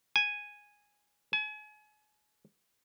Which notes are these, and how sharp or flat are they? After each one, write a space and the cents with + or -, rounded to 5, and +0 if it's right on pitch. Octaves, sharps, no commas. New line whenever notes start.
G#5 -5
G#5 +35